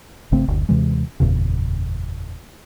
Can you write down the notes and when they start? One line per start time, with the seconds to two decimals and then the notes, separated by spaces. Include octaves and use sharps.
0.32 G#1 C#3 A3 C4
0.48 F#1 D2
0.69 D#2 C3 E3 G#3
1.20 F#1 E2 A#2 C#3